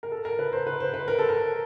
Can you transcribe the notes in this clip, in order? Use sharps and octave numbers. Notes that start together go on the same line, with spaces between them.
A#4
A4
A#4
B4
C5
B4
C5
B4
A#4
A4
A#4